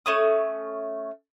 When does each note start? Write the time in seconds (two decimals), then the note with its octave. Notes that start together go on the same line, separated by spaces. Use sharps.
0.06 A3 C#4 D#6